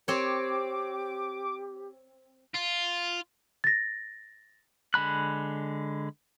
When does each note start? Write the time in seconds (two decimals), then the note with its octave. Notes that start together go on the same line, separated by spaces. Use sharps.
0.08 C4 G4 C#5 D6
2.55 F4
3.64 A6 A#6
4.94 D3 G#3 B5 F#6